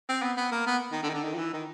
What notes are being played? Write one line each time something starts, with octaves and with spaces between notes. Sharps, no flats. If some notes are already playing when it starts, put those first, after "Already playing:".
C4
B3
B3
A#3
B3
D#3
D3
D#3
D3
D#3
F3
E3
D#3